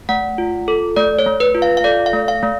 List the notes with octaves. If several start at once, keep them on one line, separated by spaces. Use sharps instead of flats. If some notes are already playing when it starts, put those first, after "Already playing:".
A3 F#5
F4
A4
A3 D5
C#5
A3
B4
F4
F5
F5
A4 D5
F5
A3
F5
A3